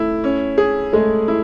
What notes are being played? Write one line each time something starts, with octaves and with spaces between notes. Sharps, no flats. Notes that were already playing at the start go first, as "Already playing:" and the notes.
Already playing: A3 E4
C#4
G#4
G#3 A3
E4